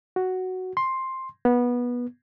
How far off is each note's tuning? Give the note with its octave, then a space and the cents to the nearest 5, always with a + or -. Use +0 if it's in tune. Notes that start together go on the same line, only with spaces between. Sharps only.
F#4 +5
C6 +10
B3 -20